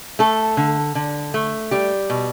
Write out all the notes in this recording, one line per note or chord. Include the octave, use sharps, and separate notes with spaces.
A3 A4
D3
D3
A3
G3 G4
B2